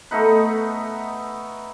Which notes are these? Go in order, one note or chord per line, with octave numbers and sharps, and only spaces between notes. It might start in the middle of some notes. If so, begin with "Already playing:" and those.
A3 B3 D#4 B4